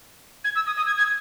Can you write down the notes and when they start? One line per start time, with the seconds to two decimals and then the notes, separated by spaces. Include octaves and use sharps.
0.44 G#6
0.55 E6
0.66 D#6
0.77 D#6
0.87 G#6
0.98 G#6